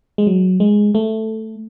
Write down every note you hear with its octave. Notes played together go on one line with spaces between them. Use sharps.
G#3
F#3
G#3
A3